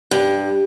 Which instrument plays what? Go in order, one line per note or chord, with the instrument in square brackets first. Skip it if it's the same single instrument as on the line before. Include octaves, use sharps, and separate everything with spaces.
[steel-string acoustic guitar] G2